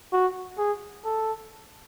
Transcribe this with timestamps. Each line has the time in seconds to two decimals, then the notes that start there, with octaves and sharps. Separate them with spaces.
0.12 F#4
0.58 G#4
1.05 A4